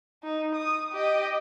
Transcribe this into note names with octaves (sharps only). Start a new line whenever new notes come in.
D#4
D#6
G4 D#5